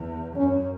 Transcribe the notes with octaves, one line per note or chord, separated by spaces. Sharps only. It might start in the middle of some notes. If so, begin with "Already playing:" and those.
Already playing: E2
F#2 C#4